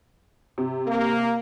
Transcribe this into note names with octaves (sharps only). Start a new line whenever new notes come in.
C3
A#3